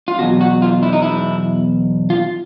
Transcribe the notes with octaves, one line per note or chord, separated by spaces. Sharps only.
F4
E2 B2 F#3 F#4
F#4
F4
E4
D#4
E4
F4